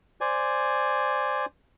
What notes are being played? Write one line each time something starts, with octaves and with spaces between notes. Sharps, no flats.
C5 D5 G#5